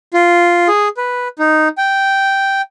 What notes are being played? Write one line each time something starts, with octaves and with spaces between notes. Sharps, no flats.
F4
G#4
B4
D#4
G5